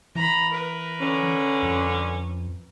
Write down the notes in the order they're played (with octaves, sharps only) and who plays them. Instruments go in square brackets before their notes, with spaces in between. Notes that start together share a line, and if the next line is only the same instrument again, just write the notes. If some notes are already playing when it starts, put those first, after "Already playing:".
[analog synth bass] E3 [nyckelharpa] A#5 B5
[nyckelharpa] A#4 B4
[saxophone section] D3 C#4
[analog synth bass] F2